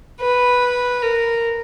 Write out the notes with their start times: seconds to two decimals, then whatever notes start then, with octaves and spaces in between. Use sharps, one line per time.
0.20 B4
1.02 A#4